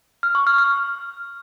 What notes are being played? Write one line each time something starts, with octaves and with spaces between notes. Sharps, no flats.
F6
C#6
F6
F6